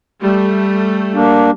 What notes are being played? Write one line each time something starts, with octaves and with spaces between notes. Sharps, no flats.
G3 A3
A#3 D4